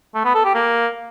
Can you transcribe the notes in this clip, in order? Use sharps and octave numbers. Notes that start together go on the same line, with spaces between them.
A3
B3
A4
G4
A#3